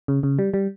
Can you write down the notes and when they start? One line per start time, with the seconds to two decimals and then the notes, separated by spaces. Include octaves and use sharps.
0.08 C#3
0.23 C#3
0.39 G3
0.54 G3